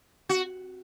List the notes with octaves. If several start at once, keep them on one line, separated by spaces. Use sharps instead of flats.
F#4